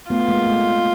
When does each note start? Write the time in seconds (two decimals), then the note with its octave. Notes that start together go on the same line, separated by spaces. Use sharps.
0.10 A3 B3 F4
0.28 G#3 A#3
0.47 A3